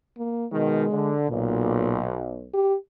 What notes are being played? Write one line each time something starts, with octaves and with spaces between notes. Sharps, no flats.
A#3
B2 D#3 G#3
D3
B1 A#2
G4